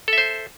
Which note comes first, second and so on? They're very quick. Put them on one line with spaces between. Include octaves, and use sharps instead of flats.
A4 E5 C5